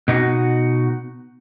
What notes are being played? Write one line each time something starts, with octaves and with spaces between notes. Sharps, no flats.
B2 D#4 F#4